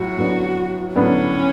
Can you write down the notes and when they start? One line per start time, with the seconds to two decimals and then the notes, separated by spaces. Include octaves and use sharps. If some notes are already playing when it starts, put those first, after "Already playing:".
Already playing: A2 F#3 F#4
0.17 A2 F#3 B3 D4
0.95 A2 F#3 B3 C#4 D4